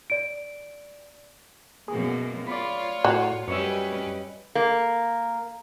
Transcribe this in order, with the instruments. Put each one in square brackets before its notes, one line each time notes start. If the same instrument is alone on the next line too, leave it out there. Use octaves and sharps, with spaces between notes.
[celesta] D5 D7
[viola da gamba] F#2 B2 A#3 [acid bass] G#4
[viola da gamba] F4 C#5 [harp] D5 B5
[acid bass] A2 [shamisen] F#3
[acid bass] F#2 [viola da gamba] G3 C#4 B4 [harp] C#5 D#5 E5
[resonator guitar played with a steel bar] A#3